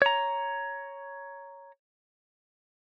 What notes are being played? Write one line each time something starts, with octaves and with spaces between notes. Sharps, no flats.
C#5 A#5